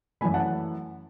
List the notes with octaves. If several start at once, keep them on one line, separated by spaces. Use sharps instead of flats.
F#2 E3 A3 G#5 B5
F#5 A5